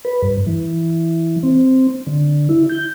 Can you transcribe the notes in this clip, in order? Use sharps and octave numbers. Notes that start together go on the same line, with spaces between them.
B4
G2
E3
C4
D3
E4
G6